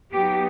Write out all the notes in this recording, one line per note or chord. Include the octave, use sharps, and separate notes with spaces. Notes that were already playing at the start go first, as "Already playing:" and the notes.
F#3 B3 D#4 G4